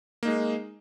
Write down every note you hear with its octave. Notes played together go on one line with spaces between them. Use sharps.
G#3 A#3 D#4